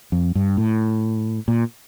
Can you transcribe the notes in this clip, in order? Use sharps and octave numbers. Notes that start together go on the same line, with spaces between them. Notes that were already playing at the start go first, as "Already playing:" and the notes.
F2
G2
A2
A#2